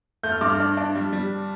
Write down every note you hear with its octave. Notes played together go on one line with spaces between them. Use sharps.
A3 G6
F6
G2 D6
F6
D4
D4
G3
G3